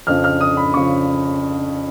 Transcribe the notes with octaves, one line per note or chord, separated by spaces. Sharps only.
F2 C#3 F3 F6
F6
D#6
B5
C#3 F3 C#6